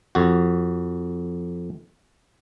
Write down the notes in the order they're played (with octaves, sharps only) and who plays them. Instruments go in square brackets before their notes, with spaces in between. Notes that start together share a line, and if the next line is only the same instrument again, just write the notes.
[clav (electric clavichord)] F2 F#4